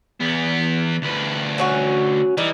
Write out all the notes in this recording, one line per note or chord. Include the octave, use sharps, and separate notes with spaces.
E2 B3
D2 B4
F#3 C#4 F#4
E3 G3 D#4